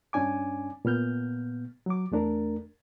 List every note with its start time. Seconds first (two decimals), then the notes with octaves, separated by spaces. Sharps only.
0.13 G2 C#4 D4 G#5 D6
0.85 A#2 B3 F6 G6
1.86 F#3 D6
2.12 E2 A3 D4 A#4